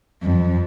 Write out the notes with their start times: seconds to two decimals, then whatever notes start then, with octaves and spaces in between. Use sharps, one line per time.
0.22 F2